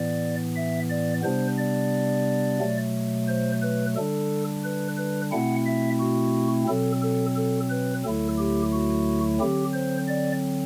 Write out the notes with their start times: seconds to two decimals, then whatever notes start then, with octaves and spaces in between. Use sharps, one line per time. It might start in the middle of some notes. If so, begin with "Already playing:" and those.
Already playing: A2 E3 B3 D5
0.56 E5
0.90 D5
1.24 C3 G3 B3 D4 C5
1.58 D5
2.60 B2 F#3 A3
3.28 C5
3.62 B4
3.96 D3 G3 D4 A4
4.64 B4
4.98 B4
5.32 B2 A3 C4 E4 F#5
5.66 E5
6.00 F#4
6.68 B2 F#3 C4 A4
7.02 A4
7.36 A4
7.70 B4
8.04 D2 D3 F#3 A3 E4 A4
8.38 G4
8.73 F#4
9.40 D3 F#3 C4 G4
9.74 C5
10.08 D5